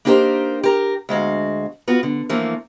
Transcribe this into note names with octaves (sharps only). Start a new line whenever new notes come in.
A#3 D4 D#4 G4 A#4 C5
G4 A#4
D2 G#3 F#4 F5
B3 F4 F#4
D3
E3 F3 A3 A#3